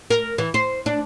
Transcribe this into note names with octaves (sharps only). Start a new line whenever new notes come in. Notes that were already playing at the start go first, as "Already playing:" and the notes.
A#4
E3
C5
D4